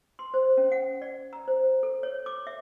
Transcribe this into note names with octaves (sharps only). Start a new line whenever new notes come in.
C6
C5
C#4
F#5
D5
A#5
C5
A4
C#5
D6
E5